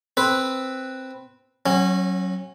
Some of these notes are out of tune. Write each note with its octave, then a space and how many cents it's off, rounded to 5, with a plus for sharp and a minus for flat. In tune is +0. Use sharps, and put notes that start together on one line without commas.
C4 +0 B4 +0
F#3 +10 C#4 -25